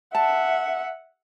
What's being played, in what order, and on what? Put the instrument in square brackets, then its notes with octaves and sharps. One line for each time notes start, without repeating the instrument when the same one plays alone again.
[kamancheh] E5 F#5 [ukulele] A5